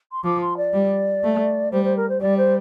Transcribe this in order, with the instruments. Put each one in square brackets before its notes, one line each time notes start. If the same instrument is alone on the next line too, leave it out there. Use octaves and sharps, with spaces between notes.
[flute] C6
[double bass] F3 [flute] D6
[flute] C6
D5
[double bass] G3
A3
[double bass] G3 [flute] C5
[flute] C5
A#4
C5
[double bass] G3 [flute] D5
[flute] C5